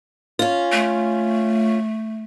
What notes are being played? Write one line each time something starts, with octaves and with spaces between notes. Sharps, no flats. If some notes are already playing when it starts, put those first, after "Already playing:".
C#4 F4
A3